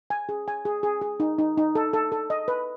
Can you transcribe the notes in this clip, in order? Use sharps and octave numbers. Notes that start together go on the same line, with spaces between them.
G#5
G#4
G#5
G#4
G#4
G#4
D#4
D#4
D#4
A4
A4
A4
D#5
B4